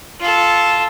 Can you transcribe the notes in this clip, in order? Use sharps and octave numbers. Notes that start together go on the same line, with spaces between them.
F4 A4